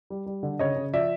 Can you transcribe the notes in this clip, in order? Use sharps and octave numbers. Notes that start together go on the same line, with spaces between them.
G3
G3
D3
C#3 C#5 D#5
C#3
F3 D5 E5